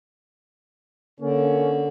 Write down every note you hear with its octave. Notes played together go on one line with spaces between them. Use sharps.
D3 A#3 C#4